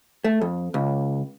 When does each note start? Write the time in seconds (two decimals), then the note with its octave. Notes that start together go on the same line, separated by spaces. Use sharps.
0.24 A3
0.41 F2
0.74 C#2